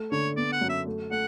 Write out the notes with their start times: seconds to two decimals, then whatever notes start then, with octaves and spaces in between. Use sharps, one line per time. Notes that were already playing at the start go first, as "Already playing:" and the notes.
Already playing: A3
0.11 D3 C#5
0.37 B3 D5
0.52 F#5
0.61 F#2
0.69 E5
0.86 A3
1.11 A3 F#5